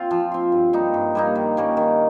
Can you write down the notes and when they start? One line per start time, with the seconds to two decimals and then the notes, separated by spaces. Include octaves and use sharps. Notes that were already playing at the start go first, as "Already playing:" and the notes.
Already playing: C4 F4
0.11 F3
0.32 C4 F4
0.52 G2
0.73 G3 A#3 D#4
0.94 G2
1.15 G3 A#3 D#4
1.35 D#3
1.57 G3 A#3 C#4
1.77 D#3